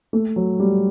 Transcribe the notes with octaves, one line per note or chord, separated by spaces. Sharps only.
A3
F#3
G3